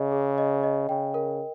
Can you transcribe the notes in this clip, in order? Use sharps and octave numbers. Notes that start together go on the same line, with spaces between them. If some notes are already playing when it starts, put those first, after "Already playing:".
Already playing: C#3 G#4 D#5
G#4
D#5
D#5
C#3 G5
A#4